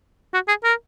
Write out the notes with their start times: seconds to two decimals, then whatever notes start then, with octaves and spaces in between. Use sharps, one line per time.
0.33 F#4
0.48 G#4
0.64 A#4